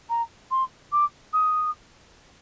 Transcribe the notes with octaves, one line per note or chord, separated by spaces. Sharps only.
A#5
C6
D6
D#6